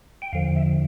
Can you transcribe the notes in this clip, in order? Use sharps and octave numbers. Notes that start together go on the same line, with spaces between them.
G5
E2 D3 F3 F5
E5